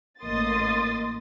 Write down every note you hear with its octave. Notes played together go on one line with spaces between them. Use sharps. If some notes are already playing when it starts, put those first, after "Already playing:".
A1 A#3 D#5 C6 D#6 A6